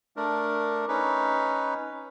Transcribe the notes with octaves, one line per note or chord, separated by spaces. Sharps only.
A3 D4 A#4
C#4 D#4 B4